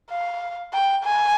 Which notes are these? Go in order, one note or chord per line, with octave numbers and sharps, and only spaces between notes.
F5
G5
G#5